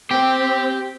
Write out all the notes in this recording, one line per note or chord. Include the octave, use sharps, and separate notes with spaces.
C4 G4